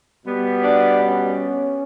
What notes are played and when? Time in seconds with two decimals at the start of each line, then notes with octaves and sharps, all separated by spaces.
0.25 B2 G3 B3
0.62 D4
1.01 C#4